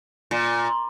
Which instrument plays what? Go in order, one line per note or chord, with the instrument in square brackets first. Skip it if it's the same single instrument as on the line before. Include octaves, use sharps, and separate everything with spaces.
[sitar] A#2